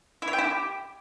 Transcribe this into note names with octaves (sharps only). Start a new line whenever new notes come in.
E4
C#5
G5
E4
G4